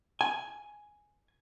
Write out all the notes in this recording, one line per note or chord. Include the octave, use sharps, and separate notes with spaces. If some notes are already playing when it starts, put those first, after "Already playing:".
G#5